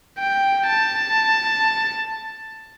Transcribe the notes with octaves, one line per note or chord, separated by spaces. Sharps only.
G5
A5